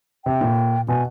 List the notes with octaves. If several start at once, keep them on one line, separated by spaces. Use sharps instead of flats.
C3 G5
A#2
B2 G#5